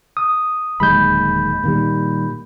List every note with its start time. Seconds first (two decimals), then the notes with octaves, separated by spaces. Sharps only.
0.17 D#6
0.80 D1 D#2 G#3 B5 G6
1.64 A#2 D#3 G3